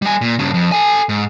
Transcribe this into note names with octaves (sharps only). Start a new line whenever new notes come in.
G3 G#5
A#2
G2 C#3
F2
A4 G#5
G#2